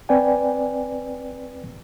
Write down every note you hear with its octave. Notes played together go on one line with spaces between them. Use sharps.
C4 B4 D5 G5 G#5